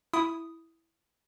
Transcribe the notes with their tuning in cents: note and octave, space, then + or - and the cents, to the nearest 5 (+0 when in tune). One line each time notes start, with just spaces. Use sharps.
E4 +0 D#6 +0